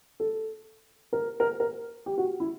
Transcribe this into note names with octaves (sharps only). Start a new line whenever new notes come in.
A4
A#4
A#4
A#4
G4
F#4
E4